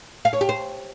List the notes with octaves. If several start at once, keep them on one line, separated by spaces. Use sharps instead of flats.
F5
C#5
G4
C5